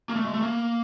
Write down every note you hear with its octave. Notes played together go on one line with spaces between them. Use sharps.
A#3
A3
G#3
A3
A#3